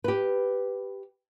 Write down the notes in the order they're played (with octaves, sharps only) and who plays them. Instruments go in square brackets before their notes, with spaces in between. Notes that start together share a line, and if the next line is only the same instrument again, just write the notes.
[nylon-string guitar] G4 B4